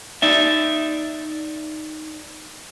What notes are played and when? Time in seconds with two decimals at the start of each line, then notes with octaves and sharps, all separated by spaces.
0.22 D#4 D5 E5